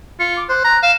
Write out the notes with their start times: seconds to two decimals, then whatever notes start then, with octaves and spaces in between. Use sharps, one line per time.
0.20 F4 C#7
0.37 D6
0.49 C5 F#6
0.64 A#5
0.83 F5 E7